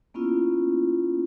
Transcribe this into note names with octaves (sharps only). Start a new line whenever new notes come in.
A#3 B3 C#4 E4 F4